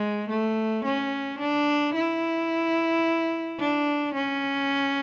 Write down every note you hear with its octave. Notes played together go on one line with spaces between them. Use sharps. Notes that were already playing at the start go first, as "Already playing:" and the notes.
Already playing: G#3
A3
C#4
D4
E4
D4
C#4